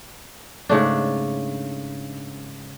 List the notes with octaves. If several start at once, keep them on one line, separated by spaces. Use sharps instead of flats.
G#2 C#3 A3 D4